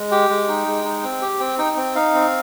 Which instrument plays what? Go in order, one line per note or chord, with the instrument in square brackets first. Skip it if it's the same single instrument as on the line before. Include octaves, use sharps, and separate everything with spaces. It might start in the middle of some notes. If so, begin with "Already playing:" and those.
Already playing: [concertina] G#3
G4 G5
G#3
D#4
G#3
D#4
C4
G4
C4 G5
D#4 G5
C4 G5
D#4 F5
C4